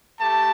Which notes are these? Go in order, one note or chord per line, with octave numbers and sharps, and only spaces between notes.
A3 G4 A5